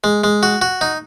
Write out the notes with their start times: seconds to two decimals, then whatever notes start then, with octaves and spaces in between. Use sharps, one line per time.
0.04 G#3
0.24 G#3
0.43 F#4
0.62 F#4
0.81 D#4